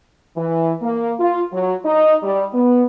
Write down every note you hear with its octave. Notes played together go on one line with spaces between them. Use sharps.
E3
A#3
F4
F#3
D#4
G3
B3